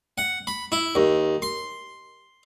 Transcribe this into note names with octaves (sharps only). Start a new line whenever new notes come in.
F#5
B5
E4
D#2
C6